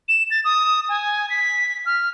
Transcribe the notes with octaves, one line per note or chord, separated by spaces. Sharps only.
E7
A6
D#6
G#5
B6
F6